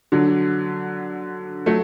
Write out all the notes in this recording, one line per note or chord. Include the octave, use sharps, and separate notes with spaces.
D3 F#3
F#3 A3